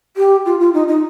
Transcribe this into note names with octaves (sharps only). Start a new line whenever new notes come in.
G4
F4
F4
D#4
D#4